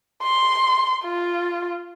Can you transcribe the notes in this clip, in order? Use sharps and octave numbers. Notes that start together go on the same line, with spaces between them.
C6
F4